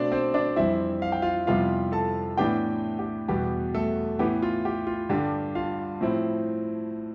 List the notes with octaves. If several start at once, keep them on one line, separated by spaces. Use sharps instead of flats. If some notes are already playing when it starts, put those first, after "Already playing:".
Already playing: B2 A3 C4 D4 D5
C4 C5
D4 D5
F2 E3 G3 C4 E4 E5
F5
G5
F4 F5
F2 C3 G3 B3 E4 F4 F5
A4 A5
A2 E3 B3 D4 G4 G5
G4
E2 B2 G3 B3 G4
A3 A4
A2 E3 B3 G4
F4
G4
F4
G2 D3 G3 D4 G4
F4 F5
A2 F3 C4 E4